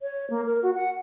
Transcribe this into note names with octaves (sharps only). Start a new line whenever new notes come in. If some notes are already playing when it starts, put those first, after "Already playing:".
C#5
A#3
A#4
F#4
F#5